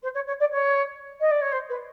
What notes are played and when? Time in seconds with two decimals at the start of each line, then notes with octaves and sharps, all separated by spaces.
0.02 C5
0.14 C#5
0.27 C#5
0.40 D5
0.51 C#5
1.20 D#5
1.31 D5
1.41 C#5
1.52 C5
1.69 B4